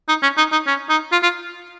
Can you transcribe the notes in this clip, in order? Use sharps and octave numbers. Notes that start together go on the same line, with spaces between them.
D#4
C#4
D#4
D#4
C#4
D#4
F4
F4